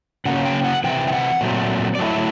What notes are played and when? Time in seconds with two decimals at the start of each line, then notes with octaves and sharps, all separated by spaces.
0.25 C#3 F#3 A#3 C#4 F#5
0.45 G5
0.64 F#5
0.84 C3 E3 G5
1.08 G5
1.13 F#5
1.41 A#2 F#3 A3 C4
1.95 D5
1.99 F#3 A3 C#4 E4 D#5
2.10 E5